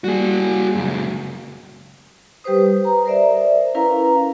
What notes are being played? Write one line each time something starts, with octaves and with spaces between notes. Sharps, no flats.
G3 A#3 F#4 G#4
C#2 F#2
G3 G4 B4 C5 D#6
B4 A#5
A#4 C5 D5 E5
C#4 E4 A#4 B4 F5 A#5